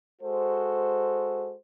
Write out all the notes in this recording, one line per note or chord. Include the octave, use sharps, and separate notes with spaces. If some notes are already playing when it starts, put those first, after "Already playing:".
G#3 F#4 A4 C5